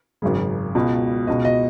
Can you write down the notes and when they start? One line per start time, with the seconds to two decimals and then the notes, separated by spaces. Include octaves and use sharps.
0.22 G#1 F#2 C#3
0.75 C#2 B2
1.27 C#2 B2 D#5
1.45 D#5